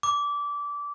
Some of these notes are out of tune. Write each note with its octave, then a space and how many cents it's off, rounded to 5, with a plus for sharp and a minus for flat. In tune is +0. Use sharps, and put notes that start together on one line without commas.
D6 -20